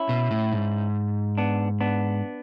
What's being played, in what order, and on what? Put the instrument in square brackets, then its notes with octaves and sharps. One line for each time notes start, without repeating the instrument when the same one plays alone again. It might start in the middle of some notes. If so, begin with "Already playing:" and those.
Already playing: [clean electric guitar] C#4 E4
[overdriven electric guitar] B2
A2
G#2
[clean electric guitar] B3 D4
B3 D4